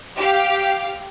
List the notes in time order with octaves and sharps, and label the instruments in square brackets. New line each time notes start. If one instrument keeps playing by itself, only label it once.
[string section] G4 F5